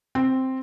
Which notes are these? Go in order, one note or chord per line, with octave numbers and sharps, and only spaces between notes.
C4